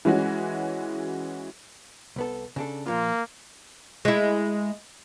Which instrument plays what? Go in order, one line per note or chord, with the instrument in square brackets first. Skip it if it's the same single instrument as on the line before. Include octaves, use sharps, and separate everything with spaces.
[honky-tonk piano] E3 G#3 C#4 F#4
[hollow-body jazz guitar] C2 B3 A4
C#3 D4 A4
[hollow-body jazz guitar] A#2 F3 F4 [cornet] A#3
[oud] G#3 E4